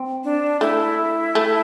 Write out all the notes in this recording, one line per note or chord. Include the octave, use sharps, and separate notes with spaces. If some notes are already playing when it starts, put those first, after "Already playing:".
Already playing: C4
D4
A3 E4
A3